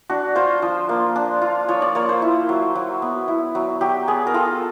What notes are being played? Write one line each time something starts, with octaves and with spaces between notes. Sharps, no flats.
D4 F#4
F4 C5
F3
A#3
D4
F4
F3 C#5
D5
A#3 C#5
C5
E4
F#3
F#3
B3
E4
F#3
F#3 G4
B3 G#4
A#4
F4 A4